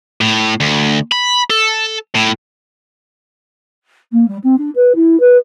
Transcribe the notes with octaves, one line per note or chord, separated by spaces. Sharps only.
A2
D2
B5
A4
A2
A#3
G3
C4
D4
B4
E4
B4